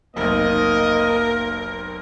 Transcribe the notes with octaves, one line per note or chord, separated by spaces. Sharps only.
F1 B1 A#3 D#4 A#4 C5 D#5